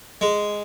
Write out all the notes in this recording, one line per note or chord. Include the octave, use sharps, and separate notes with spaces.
G#3